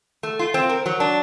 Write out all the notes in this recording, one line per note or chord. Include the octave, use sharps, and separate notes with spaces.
A3
F4
C4
A#4
F#3
D4